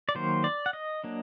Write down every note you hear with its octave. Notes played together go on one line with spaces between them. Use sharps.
D5
D#3 F#3 A#3 C5
D5
F#5
D#5
F#3 A#3 D4